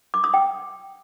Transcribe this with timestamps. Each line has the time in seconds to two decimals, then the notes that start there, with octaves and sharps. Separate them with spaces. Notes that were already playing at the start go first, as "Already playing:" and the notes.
0.14 D6
0.24 D#6
0.34 G5